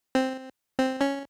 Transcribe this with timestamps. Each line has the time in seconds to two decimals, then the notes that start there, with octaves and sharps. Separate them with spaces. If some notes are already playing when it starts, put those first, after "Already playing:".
0.15 C4
0.79 C4
1.01 C#4